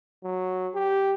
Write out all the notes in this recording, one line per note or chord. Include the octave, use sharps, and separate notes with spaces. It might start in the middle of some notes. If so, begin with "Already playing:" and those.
F#3
G4